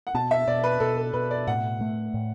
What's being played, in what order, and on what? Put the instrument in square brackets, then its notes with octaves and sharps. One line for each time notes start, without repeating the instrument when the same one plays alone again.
[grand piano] F#5
[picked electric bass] B2 [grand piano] A5
[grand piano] E5
[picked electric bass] B2 [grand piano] D5
[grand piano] B4
[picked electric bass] B2 [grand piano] A4
[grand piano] A4
[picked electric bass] B2 [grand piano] B4
[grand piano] D5
[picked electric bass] A2 [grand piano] F#5
[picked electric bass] A3
A2